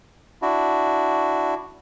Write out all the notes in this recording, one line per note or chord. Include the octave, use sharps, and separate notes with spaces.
D4 E4 F#4